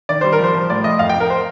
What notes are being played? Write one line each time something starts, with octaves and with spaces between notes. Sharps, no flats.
D#3 D5
G3 C5
A#4
F3 C5
F3
A2 D5
F3 D#5
F2 F5
G5
F2
A#4
C5